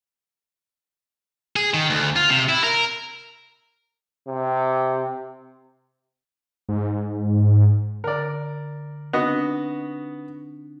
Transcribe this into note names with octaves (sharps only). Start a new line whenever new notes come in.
G#4
D#3
D2
F4
C3
E4
A#4
C3
G#2
D3 A#4 D5
B3 C4 D4 D#4 F#4 D#5